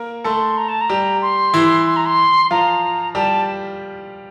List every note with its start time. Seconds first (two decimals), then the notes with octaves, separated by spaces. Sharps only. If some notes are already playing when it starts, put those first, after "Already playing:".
Already playing: A#3 A#4
0.24 A3 A4 C6
0.57 A#5
0.68 A5
0.81 A#5
0.90 G3 G4
1.22 C6
1.54 E3 E4
1.87 C6
1.96 A#5
2.06 C6
2.51 F3 F4 A#5
3.15 G3 G4 A5